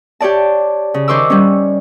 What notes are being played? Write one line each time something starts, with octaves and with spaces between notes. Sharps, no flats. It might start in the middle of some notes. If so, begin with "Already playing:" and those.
G4 C#5 D5 A5
C#3
D#3 C5 C#6 D6 E6
G3 C#4